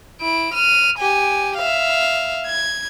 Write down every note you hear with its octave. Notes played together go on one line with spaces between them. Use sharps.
E4 D7
F6 D#7
G4 G#5
E5 F5
G#6